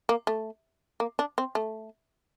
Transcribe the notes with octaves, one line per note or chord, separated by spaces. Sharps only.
A#3
A3
A#3
D4
C4
A3